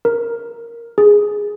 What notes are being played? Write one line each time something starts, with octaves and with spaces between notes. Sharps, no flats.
A#4
G#4